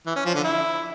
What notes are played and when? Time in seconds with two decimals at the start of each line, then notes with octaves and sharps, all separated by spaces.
0.06 E3
0.16 C#4
0.25 F3
0.35 D3
0.44 E4